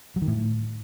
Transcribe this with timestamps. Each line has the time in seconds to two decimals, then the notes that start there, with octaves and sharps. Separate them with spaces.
0.16 F#3
0.22 D#3
0.27 A2